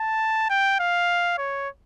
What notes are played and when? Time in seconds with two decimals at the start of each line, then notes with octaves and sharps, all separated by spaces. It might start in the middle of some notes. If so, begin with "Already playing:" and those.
Already playing: A5
0.50 G5
0.80 F5
1.38 C#5